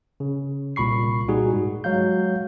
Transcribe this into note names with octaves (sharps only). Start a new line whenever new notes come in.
C#3
C2 A#2 B5 C#6 C7
A#2 G3 D#4 F#4 G#4
G#2
F#3 G#3 F5 G6